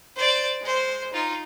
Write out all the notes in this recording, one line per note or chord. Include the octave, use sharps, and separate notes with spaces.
C5 D5
G#3 C5
D#4 F4